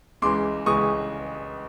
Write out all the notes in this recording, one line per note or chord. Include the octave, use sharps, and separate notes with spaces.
C#2 C#3 E3 G#3 C6 D6
C#2 C#3 E3 G#3 C#6 D#6